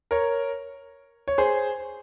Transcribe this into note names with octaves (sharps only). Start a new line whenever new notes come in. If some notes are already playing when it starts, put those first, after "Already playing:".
A#4 C#5
C#5
G#4 C5